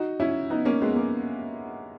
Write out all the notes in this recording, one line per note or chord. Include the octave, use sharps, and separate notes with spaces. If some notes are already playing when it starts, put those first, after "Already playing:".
Already playing: D#4 F#4
C#4 E4
B3 D#4
A#3 C#4
G#3 B3
A#3